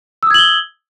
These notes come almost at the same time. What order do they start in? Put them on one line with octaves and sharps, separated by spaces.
E6 D#6 G#6 F#7 G7